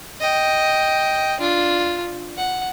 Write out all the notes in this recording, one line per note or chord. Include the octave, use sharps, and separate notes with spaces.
D#5 G5
D4 F4
F#5